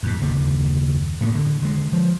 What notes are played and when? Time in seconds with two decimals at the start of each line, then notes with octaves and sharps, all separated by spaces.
0.03 F2 G#2
0.21 F#1 D#2 D3
1.21 A2 G3 A#3
1.35 D3
1.62 D3 G#3
1.93 F3